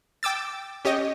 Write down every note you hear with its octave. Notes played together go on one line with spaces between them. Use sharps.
G5 D6 E6 A6
C#4 G4 C#5 D#5